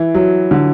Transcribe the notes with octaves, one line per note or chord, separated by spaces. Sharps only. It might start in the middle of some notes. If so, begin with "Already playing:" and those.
Already playing: E3
F#3
D3